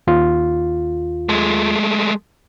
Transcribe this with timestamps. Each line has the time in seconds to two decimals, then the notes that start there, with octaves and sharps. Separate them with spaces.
0.07 D#2 F4
1.29 G#3 A3